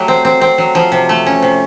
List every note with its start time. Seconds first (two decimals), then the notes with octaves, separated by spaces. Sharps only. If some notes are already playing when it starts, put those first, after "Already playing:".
Already playing: F#3 A3 G4
0.08 C4
0.25 C4
0.41 C4
0.58 F#3
0.75 F3
0.92 C3
1.09 A3
1.26 C#4
1.42 C3